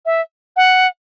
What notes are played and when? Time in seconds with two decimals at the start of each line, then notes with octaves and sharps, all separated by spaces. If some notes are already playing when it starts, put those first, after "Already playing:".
0.06 E5
0.56 F#5